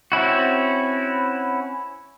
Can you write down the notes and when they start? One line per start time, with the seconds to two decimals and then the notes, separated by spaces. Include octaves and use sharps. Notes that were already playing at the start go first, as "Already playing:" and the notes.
0.12 C4 C#4 E4 F#4